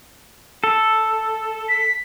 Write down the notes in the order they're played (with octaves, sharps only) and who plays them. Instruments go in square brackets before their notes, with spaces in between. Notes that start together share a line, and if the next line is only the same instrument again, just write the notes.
[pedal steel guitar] A4
[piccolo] B6